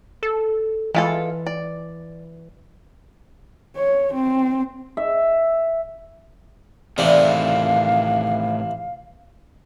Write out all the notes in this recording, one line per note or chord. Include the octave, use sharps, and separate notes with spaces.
A4
E3 G#3 F4 A4
D5
C#5
C4
E5
A2 C3 D#3 E3 D5 F5